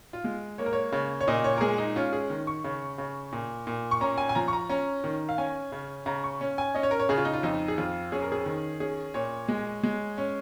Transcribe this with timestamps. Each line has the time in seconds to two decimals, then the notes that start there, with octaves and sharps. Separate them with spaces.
0.13 F4
0.24 G#3
0.58 A#3 C#5
0.66 A#4
0.73 C#5
0.92 C#3
1.21 C#5
1.28 A#2 D#5
1.44 C#5
1.57 A#4
1.61 G#3 G#4
1.78 D#4
1.96 C#4 F4
2.13 G#4
2.30 D#3
2.47 C#6
2.64 C#3
2.98 C#3
3.32 A#2
3.67 A#2
3.91 C#6
4.01 C#4 A#5
4.18 G#5
4.29 G#5
4.35 F3 A#5
4.48 C#6
4.53 A#5
4.69 C#4 A#5
5.04 D#3
5.29 F5
5.38 C#4 G#5
5.72 C#3
6.06 C#3 A#5
6.24 C#6
6.41 C#4
6.58 G#5
6.75 C#4 D#5
6.83 C#5
6.91 A#4
6.99 C#5
7.09 C#3 G#4
7.17 F4
7.25 D#4
7.33 F4
7.43 F2 D#4
7.68 G#4
7.78 F2 F4
8.12 C#4 G#4
8.22 A#4
8.32 G#4
8.46 D#3
8.80 C#4 G#4
9.14 A#2 C#5
9.48 G#3
9.83 G#3
10.18 C#4